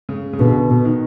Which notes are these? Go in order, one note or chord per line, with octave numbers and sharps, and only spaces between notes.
C#3
C#3
B2 D3
B2
D#3